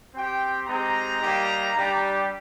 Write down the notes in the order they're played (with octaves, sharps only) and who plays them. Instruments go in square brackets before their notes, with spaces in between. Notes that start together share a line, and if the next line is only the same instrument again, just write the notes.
[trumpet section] C4 G4 G5
G#3 C4 D#4 G4 A#5
G3 A#3 D#4 G4
G3 D4 G4